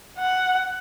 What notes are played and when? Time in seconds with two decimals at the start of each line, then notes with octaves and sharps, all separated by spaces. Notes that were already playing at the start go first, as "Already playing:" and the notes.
0.19 F#5